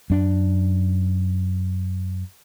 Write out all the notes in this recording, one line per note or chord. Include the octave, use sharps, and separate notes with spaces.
F#2 D4